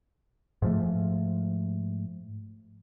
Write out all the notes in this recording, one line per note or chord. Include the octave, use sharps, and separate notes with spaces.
G#2 F3 A3